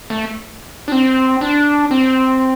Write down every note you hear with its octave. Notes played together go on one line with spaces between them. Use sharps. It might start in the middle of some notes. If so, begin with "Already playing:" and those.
A3
D4
C4
D4
C4